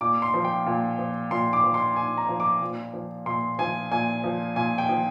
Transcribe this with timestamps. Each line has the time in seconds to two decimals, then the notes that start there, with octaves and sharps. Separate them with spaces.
0.01 A#2 D6
0.22 C6
0.34 F3
0.44 G5
0.66 A#2
0.99 F3
1.31 A#2 C6
1.53 D6
1.64 F3
1.74 C6
1.96 A#2 G#5
2.18 A#5
2.29 F3
2.40 D6
2.61 A#2
2.93 F3
3.26 A#2 C6
3.59 F3 G#5
3.91 A#2 G#5
4.24 F3
4.56 A#2 G#5
4.78 G5
4.89 F3